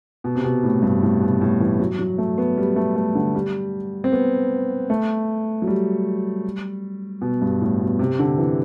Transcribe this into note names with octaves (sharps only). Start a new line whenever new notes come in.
B2
C3
B2
A2
G2
A2
B2
A2
E3
F#3
F#3
A3
B3
G3
A3
A3
D3
G3
C4
B3
A3
F#3
G3
B2
G2
A2
B2
C3
D3
E3